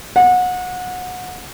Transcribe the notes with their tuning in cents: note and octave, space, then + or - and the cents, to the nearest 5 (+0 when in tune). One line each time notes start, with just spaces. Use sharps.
F#5 -25